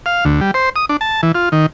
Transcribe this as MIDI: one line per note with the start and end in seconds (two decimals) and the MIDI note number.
0.06 0.25 77
0.25 0.41 38
0.41 0.51 55
0.54 0.69 72
0.76 0.85 87
0.89 0.97 62
1.01 1.21 81
1.23 1.32 52
1.35 1.49 65
1.52 1.66 51